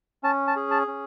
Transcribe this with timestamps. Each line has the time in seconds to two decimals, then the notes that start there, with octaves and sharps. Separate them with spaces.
0.23 C#4 A5
0.47 A5
0.56 G#4
0.71 A5
0.87 C#4